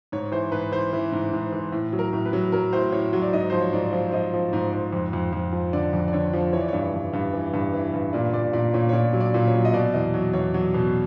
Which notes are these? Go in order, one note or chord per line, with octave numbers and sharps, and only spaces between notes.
G#2 C#5
E3 C5
G#2 B4
E3 C5
E3
G#2
G#2
E3
A2
F#3
A#4
A2
B4
F#3
F#3 A#4
A2 C5
A2 C#5
F#3
D5
G#2 D#5
F3 C5
C#5
G#2 D5
F3
F3 D#5
F3
G#2
G#2
F2
F2
F2
F3
D3 D5
F2
D5
D3 C#5
F3
E3 C#5
D5
G2 C#5
G2
G2
E3
G2
E3
G2
A#2 D5
A#2 D5
A#2 D5
A#2 C#5
C#5
A#2 D5
F#3
D5
A#2
C#5
F#3
D#5
B2 D5
E2 D#5
F#3
E2 C#5
F#3
B2